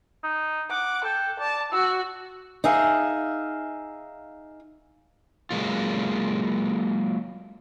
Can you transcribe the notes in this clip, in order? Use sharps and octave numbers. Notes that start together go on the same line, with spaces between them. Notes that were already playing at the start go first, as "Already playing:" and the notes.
D#4
F#5 D6
A4 G5
D5 A5
F#4 E6
D#4 G#4 E5 F5
F#3 G#3 A#3 F4